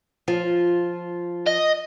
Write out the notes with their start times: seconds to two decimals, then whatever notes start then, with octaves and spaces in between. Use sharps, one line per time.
0.28 F3 F4
1.47 D#5